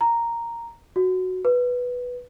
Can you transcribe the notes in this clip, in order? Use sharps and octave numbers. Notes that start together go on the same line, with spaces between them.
A#5
F#4
B4